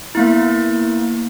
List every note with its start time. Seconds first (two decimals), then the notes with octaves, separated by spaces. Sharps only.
0.15 A#3 B3 E4